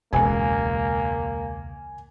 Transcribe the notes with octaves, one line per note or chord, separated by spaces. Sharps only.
E1 C#2 A#3 G#5